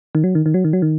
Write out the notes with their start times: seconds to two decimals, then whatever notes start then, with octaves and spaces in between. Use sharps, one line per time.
0.15 D#3
0.24 F#3
0.35 D#3
0.46 D#3
0.54 F#3
0.65 D#3
0.73 F#3
0.82 D#3